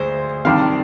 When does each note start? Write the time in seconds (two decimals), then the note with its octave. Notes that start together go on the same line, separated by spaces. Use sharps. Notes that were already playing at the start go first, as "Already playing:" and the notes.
Already playing: D2 G#3 C5
0.45 C3 D#3 G3 D4 F5